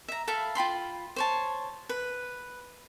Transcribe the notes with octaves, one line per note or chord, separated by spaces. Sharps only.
E5 A#5
A4 E5 F5 B5
F4 G5 B5 C6
C5 C#5 A5
B4